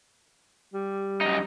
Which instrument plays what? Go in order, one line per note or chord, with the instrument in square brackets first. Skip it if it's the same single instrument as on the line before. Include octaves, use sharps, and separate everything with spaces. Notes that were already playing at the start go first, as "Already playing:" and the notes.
[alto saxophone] G3
[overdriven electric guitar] F#2 D#4